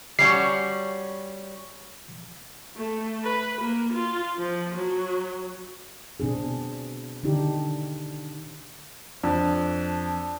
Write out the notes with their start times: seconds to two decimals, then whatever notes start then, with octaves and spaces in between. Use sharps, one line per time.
0.19 G3 C#4 F#4 C7
2.76 A3
3.23 B4
3.61 A#3
3.93 F4
4.38 F3
4.75 F#3
6.20 B2 C4 D4 G#4
7.23 D3 D#3 D4 D#4 G4
9.23 F2 D4